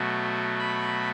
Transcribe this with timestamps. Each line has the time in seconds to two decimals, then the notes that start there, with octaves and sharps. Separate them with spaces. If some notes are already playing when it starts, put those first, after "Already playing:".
Already playing: B2 F#3 A3
0.59 B5